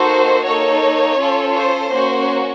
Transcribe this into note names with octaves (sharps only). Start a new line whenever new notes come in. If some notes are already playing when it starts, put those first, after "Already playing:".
Already playing: A#3 D#4 F#4 A4 C5
A#3 D#4 A4 C#5
C#4 F4 A4
C5
A#3 C#4 F#4